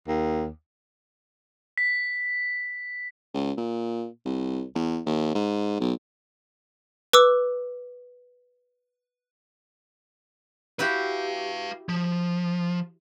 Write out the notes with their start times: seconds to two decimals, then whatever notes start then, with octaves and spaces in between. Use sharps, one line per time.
0.08 D#2
1.78 B6
3.34 C#2
3.57 A#2
4.25 C2
4.75 E2
5.06 D#2
5.35 G#2
5.80 B1
7.13 B4 D6 E6
10.79 E4 F#4 G4 B4 F5
11.89 F3